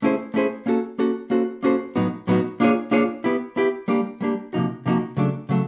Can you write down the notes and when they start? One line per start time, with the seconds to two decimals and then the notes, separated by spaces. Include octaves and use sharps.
0.02 A3 C#4 E4 G#4 C5
0.34 A3 C#4 E4 G#4 C5
0.66 A#3 C#4 F#4 A4
0.98 A#3 C#4 F#4 A4
1.30 A#3 C#4 F#4 A4 C5
1.63 A#3 C#4 F#4 A4 C5
1.96 A2 F#3 B3 D#4 F#4
2.27 A2 F#3 B3 D#4 F#4
2.60 A#3 D4 F4 G#4 C#5
2.91 A#3 D4 F4 G#4 C#5
3.24 B3 E4 G4
3.56 B3 E4 G4
3.88 G3 A#3 D4 G4
4.21 G3 A#3 D4 G4
4.53 C3 F3 A#3 D#4 F#4
4.86 C3 F3 A#3 D#4 F#4
5.17 C#3 F#3 A3 D4
5.49 C#3 F#3 A3